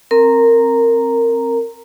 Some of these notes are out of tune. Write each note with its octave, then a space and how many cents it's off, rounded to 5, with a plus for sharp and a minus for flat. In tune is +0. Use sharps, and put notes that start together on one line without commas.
C4 +20 A#4 -15 A#5 -5